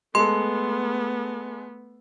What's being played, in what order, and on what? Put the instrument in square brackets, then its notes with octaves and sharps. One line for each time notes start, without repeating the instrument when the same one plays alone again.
[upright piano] G#3 A4 [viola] A3 B3 [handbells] C6